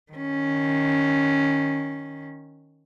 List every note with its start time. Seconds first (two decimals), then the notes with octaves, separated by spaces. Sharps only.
0.12 D#3 C#4